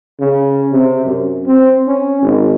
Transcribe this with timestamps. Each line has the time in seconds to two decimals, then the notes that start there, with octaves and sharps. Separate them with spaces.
0.20 C#3
0.72 C3
1.05 F#2
1.46 C4
1.87 C#4
2.22 G#1